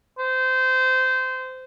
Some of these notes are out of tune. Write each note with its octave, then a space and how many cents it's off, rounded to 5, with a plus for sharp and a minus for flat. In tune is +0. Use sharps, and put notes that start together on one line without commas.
C5 -20